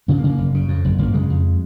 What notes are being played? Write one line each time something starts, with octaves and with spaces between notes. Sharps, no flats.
C#3 B3
A#3
C#3
A#3
F#1
C#3
F2
F#1
F#1 A#3
C#3 G#3
F2